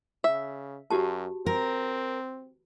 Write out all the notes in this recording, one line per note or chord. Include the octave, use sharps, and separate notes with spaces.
C#3 E5
F#2 F#4 G4 A5
C4 A#4